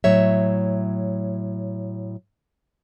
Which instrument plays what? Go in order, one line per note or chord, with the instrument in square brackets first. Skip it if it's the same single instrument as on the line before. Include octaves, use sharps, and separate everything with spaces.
[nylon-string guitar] A2 F#3 C#5 E5